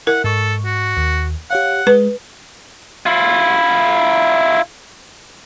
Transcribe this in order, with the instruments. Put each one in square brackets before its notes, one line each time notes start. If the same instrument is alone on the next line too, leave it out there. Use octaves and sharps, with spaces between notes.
[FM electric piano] E4 [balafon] A#4 [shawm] F#5
[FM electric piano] G#2 C#6 [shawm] A4
[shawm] F#4
[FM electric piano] D#2
[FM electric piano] G4 C#5 F5 [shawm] F#5
[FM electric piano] G#3 [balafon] B4
[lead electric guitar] E4 F4